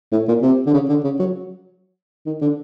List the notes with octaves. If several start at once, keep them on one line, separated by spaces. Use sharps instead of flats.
A2
A#2
C3
D3
C#3
D3
C#3
F#3
D#3
D3